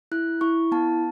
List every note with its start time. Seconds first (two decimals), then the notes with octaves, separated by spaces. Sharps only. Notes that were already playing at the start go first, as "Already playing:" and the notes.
0.12 E4 F#6
0.41 E4 C#6
0.72 B3 A5